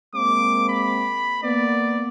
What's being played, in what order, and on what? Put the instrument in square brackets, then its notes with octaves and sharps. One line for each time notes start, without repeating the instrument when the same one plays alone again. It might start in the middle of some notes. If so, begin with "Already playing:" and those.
[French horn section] G#3 A#3 C4 [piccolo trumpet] D6
[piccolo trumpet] B5
[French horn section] A#3 B3 [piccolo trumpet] D5